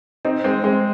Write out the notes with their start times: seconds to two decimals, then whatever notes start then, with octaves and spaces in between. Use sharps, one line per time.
0.25 C4 D#4 D#5
0.44 G#3 C4
0.63 G#3 C4 G#4